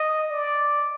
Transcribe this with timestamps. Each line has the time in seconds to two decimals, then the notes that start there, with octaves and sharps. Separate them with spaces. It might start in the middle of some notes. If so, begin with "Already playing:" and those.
Already playing: D#5
0.30 D5